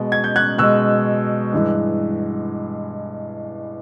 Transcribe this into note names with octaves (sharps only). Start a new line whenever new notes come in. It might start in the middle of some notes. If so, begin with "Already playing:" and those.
Already playing: B2 G#3
G#6
G6
F#6 G#6
B2 G#3 E6 F#6
G2 E3 G#3